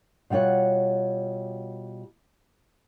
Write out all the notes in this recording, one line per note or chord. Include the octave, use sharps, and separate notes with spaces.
B2 G3 F4 C#5 F#5